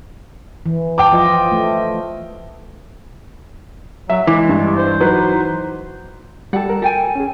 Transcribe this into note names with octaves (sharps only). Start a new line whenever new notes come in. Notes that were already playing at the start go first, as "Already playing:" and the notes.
E3
G5 A5 D6
F3 F4 D#5
A3
F#3 E5
E3 G#3 D6
G2
C5
F#3 D#4 B4
G3 A4 F#5
A#4
A4 G5 G#5
C#4 G#4